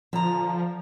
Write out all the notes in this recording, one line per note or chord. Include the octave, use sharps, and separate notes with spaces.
D3 F3 A#5